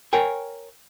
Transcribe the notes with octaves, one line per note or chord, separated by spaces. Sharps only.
A#4 C#5 G5 G#5